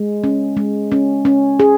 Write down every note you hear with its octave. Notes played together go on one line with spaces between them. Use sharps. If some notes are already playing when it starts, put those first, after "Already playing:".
Already playing: G#3
C#4
G#3
C#4
C#4
G#4